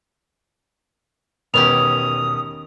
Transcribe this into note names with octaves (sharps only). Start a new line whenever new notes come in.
E1 D#3 B3 C#4 G4 D#6 F7